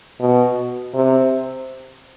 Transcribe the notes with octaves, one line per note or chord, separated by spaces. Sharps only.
B2
C3